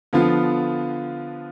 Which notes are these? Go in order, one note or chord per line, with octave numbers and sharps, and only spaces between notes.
D3 F3 B3 F4